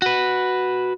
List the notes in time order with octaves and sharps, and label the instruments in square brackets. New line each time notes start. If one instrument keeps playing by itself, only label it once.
[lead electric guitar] F#4 B4